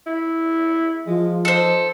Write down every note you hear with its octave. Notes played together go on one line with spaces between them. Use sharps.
E4
F3 G#3
D#4 A4 C5